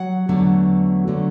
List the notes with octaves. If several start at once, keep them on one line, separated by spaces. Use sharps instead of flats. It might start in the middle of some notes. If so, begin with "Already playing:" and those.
Already playing: F#3 F#5
E2 D3 F#3 A3
D3 F#3 A3